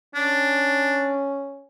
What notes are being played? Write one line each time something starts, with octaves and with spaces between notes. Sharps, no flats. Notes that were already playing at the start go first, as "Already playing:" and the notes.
C#4 D4